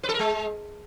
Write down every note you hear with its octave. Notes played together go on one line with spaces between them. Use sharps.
B4
A4
A#4
G#3